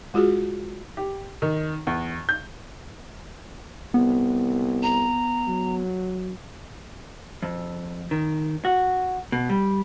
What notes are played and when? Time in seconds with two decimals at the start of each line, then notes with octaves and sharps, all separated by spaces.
0.14 G#3 F4 F#4 G#4
0.97 G4
1.42 D#3
1.87 E2
2.29 G6
3.94 C2 B3
4.83 A#5
5.47 F#3
7.43 F2
8.11 D#3
8.65 F#4
9.32 B2
9.50 G3